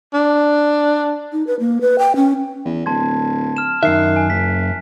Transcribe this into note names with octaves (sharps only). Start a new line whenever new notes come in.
D4
D#4
B4
A#3
B4
G5
C#4
E2
D1 A5 C6 G#6
F6 E7
F#2 D#3 E5 F#6 C7
G#5
F#1 B6